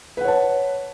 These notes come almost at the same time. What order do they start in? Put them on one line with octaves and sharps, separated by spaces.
B4 F#5 C#5 A5